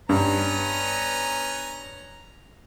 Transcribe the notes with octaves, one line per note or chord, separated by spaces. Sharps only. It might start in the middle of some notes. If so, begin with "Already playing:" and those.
G2 B3 C#4 A#5